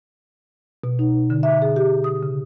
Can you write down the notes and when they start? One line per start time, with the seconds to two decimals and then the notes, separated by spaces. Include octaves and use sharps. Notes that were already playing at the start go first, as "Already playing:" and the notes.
0.84 B2
0.99 D#4
1.30 D3
1.43 E5
1.62 G#4
1.76 G4
2.04 D#6
2.23 C#3